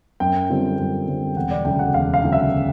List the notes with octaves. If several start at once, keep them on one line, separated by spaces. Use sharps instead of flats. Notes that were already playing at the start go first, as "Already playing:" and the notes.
F#2 G5
D3 G3 C4 F4
F#2
D3 G3 C4 F4
E1 F#5
D5
D2 C#3 F#3 G5
F#5
E1 F5
F5
D2 C#3 F#3
E5